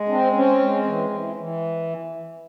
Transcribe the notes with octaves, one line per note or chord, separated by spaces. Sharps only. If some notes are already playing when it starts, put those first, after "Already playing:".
Already playing: G#3
C4 D4
C4 C#4
G#3
E3
E3
E3